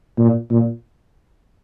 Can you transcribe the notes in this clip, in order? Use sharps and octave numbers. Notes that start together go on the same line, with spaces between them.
A#2
A#2